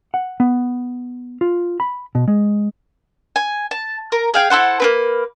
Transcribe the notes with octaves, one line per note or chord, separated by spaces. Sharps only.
F#5
B3
F4
B5
B2
G#3
G#5
A5
A#4
G#4 F5 G5
E4 A4 C5 F#5
A#3 C4 B4